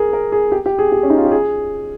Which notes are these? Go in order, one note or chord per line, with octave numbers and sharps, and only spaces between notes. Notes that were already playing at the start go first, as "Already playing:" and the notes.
Already playing: G#4 A#4
A#4
G#4
G4
G4
G#4
G4
C#4
D#4
F4
G4
G#4